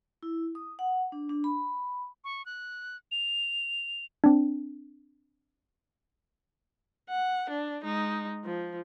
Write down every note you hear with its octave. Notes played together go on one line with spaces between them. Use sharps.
E4
D#6
F#5
D4
D4
B5
C#6
F#6
F7
C4 D4
F#5
D4
G#3 D#4
F3